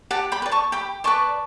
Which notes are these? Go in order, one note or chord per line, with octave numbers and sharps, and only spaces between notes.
G4 F#5 A5
G5 B5
B4 D5
A5 C#6
G4 G5 B5
B4 D5 A5 C#6